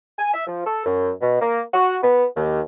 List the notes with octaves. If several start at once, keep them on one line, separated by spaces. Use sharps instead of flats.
G#5
E5
F3
A4
F#2
B2
A#3
F#4
B3
D#2